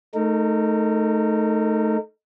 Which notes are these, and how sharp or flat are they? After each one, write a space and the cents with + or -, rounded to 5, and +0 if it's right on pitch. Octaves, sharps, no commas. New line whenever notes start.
A3 -15 D#4 +0 A#4 -30